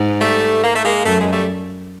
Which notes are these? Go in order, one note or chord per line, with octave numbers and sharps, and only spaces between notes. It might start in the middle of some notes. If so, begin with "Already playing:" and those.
Already playing: G#2
G3 A3
A#3
A3
G#3 A#3
F#2 A3
G#3
G3 A3